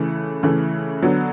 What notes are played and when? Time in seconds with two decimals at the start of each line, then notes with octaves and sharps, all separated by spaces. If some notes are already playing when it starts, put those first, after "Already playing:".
Already playing: C#3 E3 A3
0.43 C#3 E3 A3
1.02 D3 F#3 B3